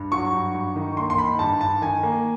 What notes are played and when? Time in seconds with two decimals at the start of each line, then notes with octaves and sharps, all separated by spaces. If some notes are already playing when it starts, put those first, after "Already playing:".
Already playing: G2
0.12 F#3 C#6
0.33 G2
0.54 G2
0.76 D#3
0.97 A#3 C6
1.10 C6
1.18 D#3 B5
1.39 G2 A5
1.61 G2 A5
1.81 D#3 G#5
2.03 A#3